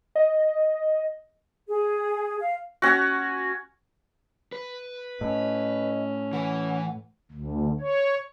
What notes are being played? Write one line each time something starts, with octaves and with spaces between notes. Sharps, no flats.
D#5
G#4
F5
C#4 F#4
B4
A2 C#4 D#5
E3 B4 F#5
D2
C#5